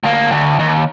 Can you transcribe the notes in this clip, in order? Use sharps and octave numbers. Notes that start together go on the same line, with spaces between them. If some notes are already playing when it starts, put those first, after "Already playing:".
D2 A#3
D2
D#2